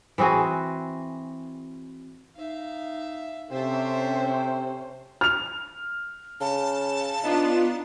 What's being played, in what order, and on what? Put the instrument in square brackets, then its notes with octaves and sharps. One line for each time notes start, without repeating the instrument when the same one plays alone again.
[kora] E3 C4 F#4 G#4
[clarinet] D#4 [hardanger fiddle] E5 F5
[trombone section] C3 [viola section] C#4 C5 [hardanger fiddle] A4 E5 [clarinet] G5
[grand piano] F6 F7
[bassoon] C#3 [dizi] A5
[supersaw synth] B3 D4 F4 [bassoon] D#4